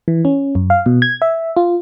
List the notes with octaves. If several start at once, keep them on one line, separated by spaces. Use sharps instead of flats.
E3
C#4
F#2
F5
B2
G#6
E5
F4